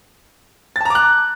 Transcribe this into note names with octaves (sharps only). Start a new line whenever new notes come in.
A5 A#5 D6 F#6 A6